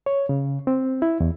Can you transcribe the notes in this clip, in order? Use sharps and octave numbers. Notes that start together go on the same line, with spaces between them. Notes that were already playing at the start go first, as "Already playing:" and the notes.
C#5
C#3
C4
E4
E2